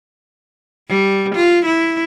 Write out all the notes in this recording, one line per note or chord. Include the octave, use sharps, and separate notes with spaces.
G3
F4
E4